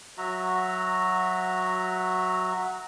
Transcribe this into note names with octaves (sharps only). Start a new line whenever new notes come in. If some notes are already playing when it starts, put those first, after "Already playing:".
F#3 F#4 E5 A#5